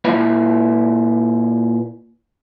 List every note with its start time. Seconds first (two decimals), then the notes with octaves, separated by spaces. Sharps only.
0.04 A#2 E4 B4 F5 B5